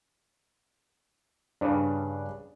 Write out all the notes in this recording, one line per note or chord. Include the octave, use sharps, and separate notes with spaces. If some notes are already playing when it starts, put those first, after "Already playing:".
G2 C#3 D4 D5